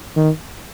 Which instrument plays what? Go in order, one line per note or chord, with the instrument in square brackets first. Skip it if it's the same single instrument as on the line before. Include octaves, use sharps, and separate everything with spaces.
[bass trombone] D#3